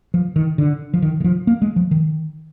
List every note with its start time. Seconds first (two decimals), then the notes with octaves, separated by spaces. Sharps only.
0.14 F3
0.36 D#3
0.58 D3
0.94 F3
1.02 D#3
1.20 D#3
1.24 F3
1.47 A#3
1.62 G#3
1.76 F3
1.91 D#3